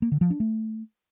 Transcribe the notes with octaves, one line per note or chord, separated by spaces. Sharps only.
A#3
D3
F3
D4
A3